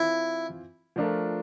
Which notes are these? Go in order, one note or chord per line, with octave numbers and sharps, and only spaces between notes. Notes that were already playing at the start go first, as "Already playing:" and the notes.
Already playing: E3 C4 E4 F4
F3 A3 D4 F4 A#4